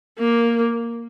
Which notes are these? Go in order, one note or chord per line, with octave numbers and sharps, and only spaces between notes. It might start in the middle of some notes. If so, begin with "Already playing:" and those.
A#3